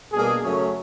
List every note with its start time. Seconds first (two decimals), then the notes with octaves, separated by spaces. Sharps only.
0.12 B2 G3 A#3 D4 G#4
0.43 F#2 C#3 F#3 A3 C#4